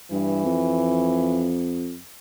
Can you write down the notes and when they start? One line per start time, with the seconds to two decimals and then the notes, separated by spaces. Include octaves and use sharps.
0.11 G2 E3
0.45 F2